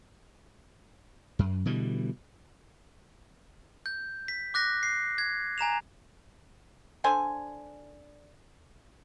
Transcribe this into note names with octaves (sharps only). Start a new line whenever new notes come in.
F#2
B2 D3 E3 G3
G6
B6
D6 F#6 A#6 B6
C7
G#6
G#5 A#5 E7 F7
D3 C5 G#5